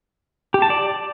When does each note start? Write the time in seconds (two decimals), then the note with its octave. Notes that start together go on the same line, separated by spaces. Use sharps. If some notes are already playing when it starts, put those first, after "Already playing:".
0.54 G4
0.62 A5
0.70 D5